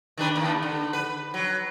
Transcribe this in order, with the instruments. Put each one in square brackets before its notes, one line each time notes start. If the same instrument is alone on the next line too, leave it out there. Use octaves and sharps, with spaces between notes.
[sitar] D#3 D4 B4
D#2
D3
B4
F#3